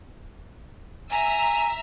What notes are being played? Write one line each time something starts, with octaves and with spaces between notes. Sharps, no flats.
E5 G#5 A#5